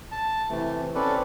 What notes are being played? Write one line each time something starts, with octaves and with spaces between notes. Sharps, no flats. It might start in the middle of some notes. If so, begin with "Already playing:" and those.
A5
C3 E3 A3
C4 C#4 A4 B4 D5